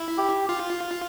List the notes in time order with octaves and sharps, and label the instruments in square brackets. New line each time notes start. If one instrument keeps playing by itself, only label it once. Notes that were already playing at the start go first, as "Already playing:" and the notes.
Already playing: [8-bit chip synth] E4
[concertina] G4
[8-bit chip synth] F4